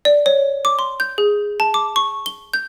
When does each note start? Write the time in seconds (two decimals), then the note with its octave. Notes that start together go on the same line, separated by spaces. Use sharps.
0.05 D5
0.26 C#5
0.65 D6
0.79 C6
1.00 G6
1.18 G#4
1.60 A5
1.74 D6
1.96 C#6
2.26 G7
2.53 G6